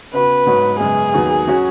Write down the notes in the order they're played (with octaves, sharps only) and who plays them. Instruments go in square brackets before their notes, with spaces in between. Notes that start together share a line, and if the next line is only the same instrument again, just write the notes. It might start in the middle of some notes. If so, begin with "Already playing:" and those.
[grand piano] C#3 B3 F#4 [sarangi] B4
[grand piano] G#2 F#3 B3 F#4 C#5
[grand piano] F#2 C#3 G#3 B3 [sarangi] G#4
[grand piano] D#2 D#3 F#3 B3
F#3 C#4 F#4